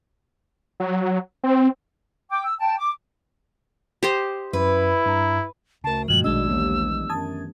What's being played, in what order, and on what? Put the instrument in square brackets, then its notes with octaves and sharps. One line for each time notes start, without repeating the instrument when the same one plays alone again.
[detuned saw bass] F#3
C4
[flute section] G5 D6 G6
E6
G5 A5
D6
[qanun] G4 C5 D#5
[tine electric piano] F#2 [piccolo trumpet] E4 [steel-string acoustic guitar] B4
[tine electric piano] G2 A#5
[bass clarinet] D2 [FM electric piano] C#3 A#4 [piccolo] A5
[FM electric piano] G2 F3 [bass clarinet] B2 [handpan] D#3 F#3 A3 [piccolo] F#7
[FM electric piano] A#1 G#3 D#5 [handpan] D4 [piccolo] E6
[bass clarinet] D#2 [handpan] E3 B3 G4
[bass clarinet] F#2 [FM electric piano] A5 D#6 G#6